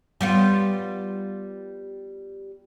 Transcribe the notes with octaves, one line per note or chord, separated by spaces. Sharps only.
G3 B3 F4